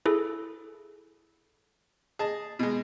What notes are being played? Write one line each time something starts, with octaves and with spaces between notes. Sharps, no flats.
E4 G#4 A4
G#4 D#5 A5
B2 G#3